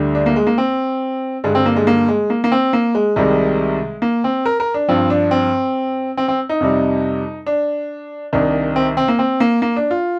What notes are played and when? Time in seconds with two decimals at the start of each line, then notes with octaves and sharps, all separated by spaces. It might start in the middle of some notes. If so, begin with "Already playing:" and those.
Already playing: D2 D3 G3
0.15 D4
0.26 A#3
0.36 G#3
0.47 A#3
0.58 C4
1.44 G2 D3 G3 G#3
1.55 C4
1.66 A#3
1.76 G#3
1.87 A#3
2.08 G#3
2.30 A#3
2.44 A#3
2.52 C4
2.73 A#3
2.95 G#3
3.16 C2 C3 D#3 G3 G#3
4.02 A#3
4.24 C4
4.46 A#4
4.60 A#4
4.74 D4
4.88 G2 F3 C4
5.10 D4
5.31 C4
6.17 C4
6.28 C4
6.49 D#4
6.60 F2 C3 G3
7.47 D4
8.33 C2 C3 D#3 D4
8.76 C4
8.97 C4
9.08 A#3
9.19 C4
9.40 A#3
9.62 A#3
9.76 D4
9.91 F4